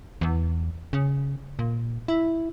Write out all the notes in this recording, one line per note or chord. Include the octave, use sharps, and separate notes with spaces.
E2
C#3
A#2
E4